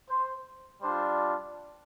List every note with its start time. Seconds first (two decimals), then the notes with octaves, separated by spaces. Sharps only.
0.10 C5
0.82 G3 D4 F4 C5